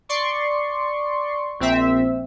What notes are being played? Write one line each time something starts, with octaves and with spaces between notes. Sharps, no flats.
D5 C6 C#6
A#1 C4 E5